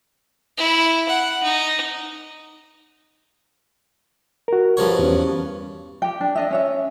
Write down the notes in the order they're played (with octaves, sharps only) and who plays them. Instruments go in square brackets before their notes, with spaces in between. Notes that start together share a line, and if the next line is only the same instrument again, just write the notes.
[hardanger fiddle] E4
F#5
D#4
[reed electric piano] F#4 A#4
[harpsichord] G2 F3 C#5
[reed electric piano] E2 B3 C#4
[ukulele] G4 G5
D4
D4 D#5 E5
C#4 C#5 E5